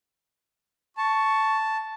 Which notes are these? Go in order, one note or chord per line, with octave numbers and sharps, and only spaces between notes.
A5 C#6